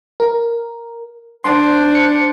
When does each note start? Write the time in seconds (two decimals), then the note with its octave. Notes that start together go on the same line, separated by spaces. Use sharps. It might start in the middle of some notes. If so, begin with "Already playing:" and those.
0.20 A#4
1.44 D4 C5 C6
1.95 C#7